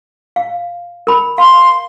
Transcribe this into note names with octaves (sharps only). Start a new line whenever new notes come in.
F5
A#4 B5
F5 C6